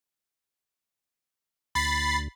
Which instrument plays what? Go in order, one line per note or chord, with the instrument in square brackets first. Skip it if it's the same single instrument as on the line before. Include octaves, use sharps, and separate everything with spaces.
[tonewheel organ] D2 [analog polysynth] B5 A6 C7